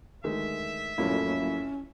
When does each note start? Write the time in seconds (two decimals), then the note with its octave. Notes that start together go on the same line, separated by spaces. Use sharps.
0.24 D2 D#3 G#3 E5
0.98 A1 F2 F#3 A#3 C#4 E4